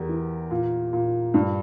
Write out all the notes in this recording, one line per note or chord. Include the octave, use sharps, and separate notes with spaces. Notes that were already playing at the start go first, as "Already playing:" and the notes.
Already playing: E2 G4 A#4
E3
A#2
A#2
G2